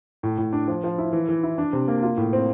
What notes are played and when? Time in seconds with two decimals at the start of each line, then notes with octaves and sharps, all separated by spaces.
0.23 A2
0.38 A2
0.53 D4
0.68 F3
0.84 F3
0.98 E4
1.13 E3
1.29 E3
1.43 E4
1.58 D4
1.73 C3
1.88 A#3
2.03 F4
2.17 A2
2.33 C4